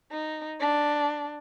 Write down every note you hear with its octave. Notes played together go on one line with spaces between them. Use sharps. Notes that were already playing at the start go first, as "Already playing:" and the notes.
D#4
D4